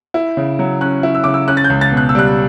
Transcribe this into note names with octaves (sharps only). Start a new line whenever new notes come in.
E4
C#3
F#3
C#4 F#6
E4
E6
C#3 D6
E6
C#4 F#6
A6
G6
C#2
A6
B2
F#6
E6
G3 F#6